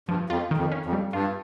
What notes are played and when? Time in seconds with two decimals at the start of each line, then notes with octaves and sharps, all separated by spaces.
0.09 G2 F3
0.30 F2 F4
0.51 D#3
0.57 F2
0.72 C#4
0.86 F2
0.93 G3
1.13 G2 F4